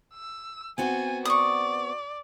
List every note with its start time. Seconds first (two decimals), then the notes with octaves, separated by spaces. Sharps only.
0.14 E6
0.78 B3 C4 F#4 G#5
1.25 D5 C#6 D#6